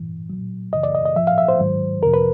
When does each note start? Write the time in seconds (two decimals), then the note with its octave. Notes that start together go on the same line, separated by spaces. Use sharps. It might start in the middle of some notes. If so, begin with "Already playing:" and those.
Already playing: G2 E3
0.30 A#2 F#3
0.73 F#2 C#3 E3 D#5
0.83 D5
0.95 D#5
1.05 D#5
1.16 G#2 F3 E5
1.27 F5
1.38 E5
1.48 C5
1.60 G#2 D#3 F#3
2.03 F2 C3 F3 A#4
2.14 B4